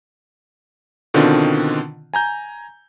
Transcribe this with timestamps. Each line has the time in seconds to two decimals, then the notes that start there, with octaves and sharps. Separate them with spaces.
1.14 B2 D3 D#3 C4 D4 F4
2.14 G#5 A#5 G6